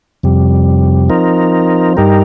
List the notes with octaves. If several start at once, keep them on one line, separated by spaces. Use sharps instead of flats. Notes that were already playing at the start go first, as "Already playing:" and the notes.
F2 C3 G3
F3 C4 D#4 A#4
G2 G3 D#4 G4 A#4